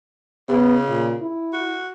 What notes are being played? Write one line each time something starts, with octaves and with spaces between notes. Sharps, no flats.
C#3 B3
A#2
E4
F#4